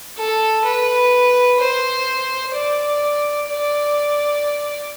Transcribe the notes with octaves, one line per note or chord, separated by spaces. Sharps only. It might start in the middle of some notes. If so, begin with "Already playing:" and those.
A4
B4
C5
D5
D5